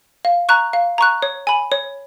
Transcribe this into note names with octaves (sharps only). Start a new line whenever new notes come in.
F5
A#5 C#6 F#6
F5
A#5 C#6 F#6
C#5
G#5 B5
C#5